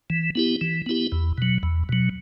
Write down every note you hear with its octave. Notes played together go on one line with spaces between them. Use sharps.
E3
B3 E4 G4
E3
B3 E4 G4
E2
B2 F#3
E2
B2 F#3